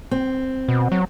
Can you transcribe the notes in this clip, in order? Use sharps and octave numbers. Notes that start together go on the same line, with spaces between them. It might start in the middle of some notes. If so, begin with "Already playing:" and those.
C4
B2
F#3